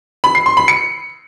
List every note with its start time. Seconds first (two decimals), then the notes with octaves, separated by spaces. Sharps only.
0.24 B5
0.35 C7
0.46 C6
0.57 B5
0.68 C#7